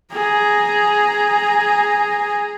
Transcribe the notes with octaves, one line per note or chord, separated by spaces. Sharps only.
G#4 A#5